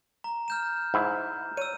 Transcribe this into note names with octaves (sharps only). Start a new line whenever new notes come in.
A#5
F6 G6 E7
G#2 E4
C#5 E6 D#7